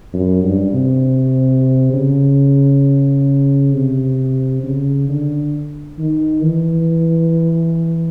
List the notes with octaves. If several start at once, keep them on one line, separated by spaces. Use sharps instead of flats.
F#2
G2
C3
C#3
C3
C#3
D3
D#3
E3